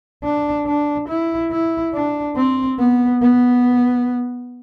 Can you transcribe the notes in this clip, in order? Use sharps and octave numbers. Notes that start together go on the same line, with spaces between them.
D4
D4
E4
E4
D4
C4
B3
B3